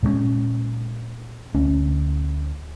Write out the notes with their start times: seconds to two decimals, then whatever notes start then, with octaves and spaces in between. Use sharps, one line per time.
0.03 A#2 G#3 A3 C#4
1.55 D2 C#4